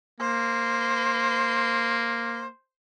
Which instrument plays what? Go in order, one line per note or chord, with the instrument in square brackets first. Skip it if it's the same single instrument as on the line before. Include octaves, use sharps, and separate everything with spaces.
[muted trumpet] A#3 [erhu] C5